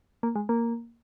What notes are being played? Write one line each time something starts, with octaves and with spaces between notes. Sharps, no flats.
A#3
G#3
A#3